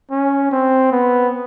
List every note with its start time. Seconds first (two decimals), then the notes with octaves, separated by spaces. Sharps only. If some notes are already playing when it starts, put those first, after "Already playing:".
0.11 C#4
0.51 C4
0.92 B3